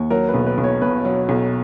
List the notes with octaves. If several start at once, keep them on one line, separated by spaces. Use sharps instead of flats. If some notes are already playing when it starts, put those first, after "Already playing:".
Already playing: D#2
F#3 A#4
B4
B1
B4
B1
C#5
B2 B4
F#3
B1